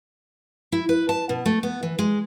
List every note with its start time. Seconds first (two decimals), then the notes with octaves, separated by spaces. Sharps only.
0.72 E4
0.89 B4
1.09 A5
1.29 B2
1.46 A3
1.63 B3
1.83 E3
1.99 G#3